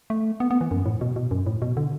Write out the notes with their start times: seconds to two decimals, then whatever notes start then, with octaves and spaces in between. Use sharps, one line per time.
0.10 A3
0.40 B3
0.51 B3
0.61 E3
0.71 F#2
0.86 A2
1.01 B2
1.16 B2
1.31 F#2
1.47 A2
1.62 B2
1.77 D3